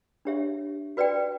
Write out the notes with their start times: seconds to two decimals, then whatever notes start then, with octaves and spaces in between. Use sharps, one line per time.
0.25 D4 G4 C#5 E5
0.97 F#4 B4 D5 G5